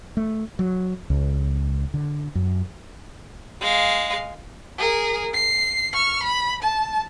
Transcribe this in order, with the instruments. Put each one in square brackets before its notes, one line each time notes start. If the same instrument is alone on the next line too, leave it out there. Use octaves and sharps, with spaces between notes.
[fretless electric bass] A3
F#3
C#2
D3
F#2
[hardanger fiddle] G#3 F5
[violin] G#4 A#4
C7
C#6 F6
B5
A5